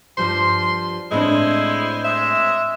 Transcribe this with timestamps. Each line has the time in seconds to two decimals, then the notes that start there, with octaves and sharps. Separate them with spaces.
0.18 G2 F3 G3 C5 C6
1.11 A2 G#3 C4 D4 E4 C5
2.05 G#3 E5